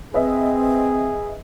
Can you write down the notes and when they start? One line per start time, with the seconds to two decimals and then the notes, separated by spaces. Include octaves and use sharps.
0.14 C4 G#4 B4 D#5 E5